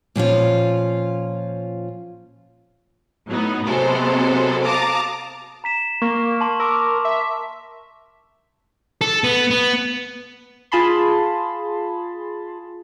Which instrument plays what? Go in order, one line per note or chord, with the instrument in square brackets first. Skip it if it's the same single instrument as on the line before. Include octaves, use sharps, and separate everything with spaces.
[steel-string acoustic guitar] A#2 F3 C#4 F4
[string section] A2 F#3 B3 D#4
C3 F#3 G#3 B3 A4 C5
F5 A5 A#5 D6 D#6
[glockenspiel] A#5 B6 E7
[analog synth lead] A#3 [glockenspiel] C#6
[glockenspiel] A5 C6 C#6
[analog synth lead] A#4 [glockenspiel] D6 E6
[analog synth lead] E5
[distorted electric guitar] A4
B3
B3
[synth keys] F4 G#4 A5 B5 C6